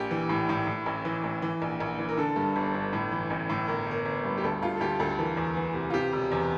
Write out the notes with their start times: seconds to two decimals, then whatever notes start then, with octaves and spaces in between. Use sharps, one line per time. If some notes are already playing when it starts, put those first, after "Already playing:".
Already playing: A#1 G4
0.11 E3
0.29 A2
0.49 A2
0.67 A2
0.86 A1
1.05 E3
1.24 A1
1.42 E3
1.62 A#1
1.80 A#1
1.99 E3
2.09 A#4
2.17 D3 A4
2.36 G2
2.56 G1
2.74 G1
2.93 A2
3.12 E3
3.30 A1
3.49 A2
3.68 G1 A#4
3.86 G1 A#4
4.06 G1
4.24 G2
4.38 G4
4.43 D2 A4
4.62 D2 F4
4.75 A4
4.81 D2 G4
5.00 D2 A4
5.19 E3 A#4
5.37 E2
5.57 E3
5.74 C3
5.90 F4
5.94 C3 G4
6.13 E1
6.32 E2